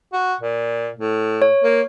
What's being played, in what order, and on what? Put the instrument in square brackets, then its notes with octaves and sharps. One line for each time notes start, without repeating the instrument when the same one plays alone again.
[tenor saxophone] F#4
A#2
A2
[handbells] C#5
[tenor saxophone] A#3